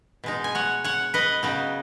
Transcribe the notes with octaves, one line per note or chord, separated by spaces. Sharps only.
B2 G#3 D#4
G#5
C#5 F#5
C#5 F#5
B4 D#5
C#3 F#3 B3 D#4